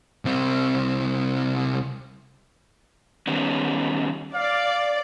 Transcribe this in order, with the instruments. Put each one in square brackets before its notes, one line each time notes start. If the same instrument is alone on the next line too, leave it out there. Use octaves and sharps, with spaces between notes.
[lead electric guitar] C2 C4
[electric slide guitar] D#3 G3 B3 C#4
[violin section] D5 [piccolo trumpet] F5